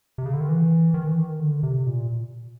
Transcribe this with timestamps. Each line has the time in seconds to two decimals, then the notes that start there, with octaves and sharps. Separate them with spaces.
0.18 C3
0.26 C#3
0.33 D3
0.41 D#3
0.49 E3
0.94 D#3
1.06 E3
1.19 D#3
1.40 D3
1.63 C3
1.87 A#2